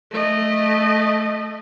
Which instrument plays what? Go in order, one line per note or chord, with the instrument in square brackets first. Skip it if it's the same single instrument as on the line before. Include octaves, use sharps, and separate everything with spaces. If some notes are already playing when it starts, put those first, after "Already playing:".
[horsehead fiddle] A3 D#5